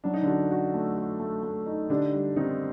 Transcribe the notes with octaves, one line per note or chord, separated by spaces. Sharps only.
F#3 D4
D#4
D3 D4 F#4
F#4
A3
F#4
A3
A3
D#4
D3 D4 G4
G3
D#3 C4 D#4